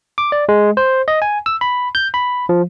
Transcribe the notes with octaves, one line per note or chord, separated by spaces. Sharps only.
D6
D5
G#3
C5
D#5
G#5
E6
B5
G6
B5
F3